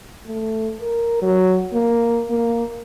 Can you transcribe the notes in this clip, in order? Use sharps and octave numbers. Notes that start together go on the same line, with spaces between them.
A3
A#4
F#3
A#3
A#3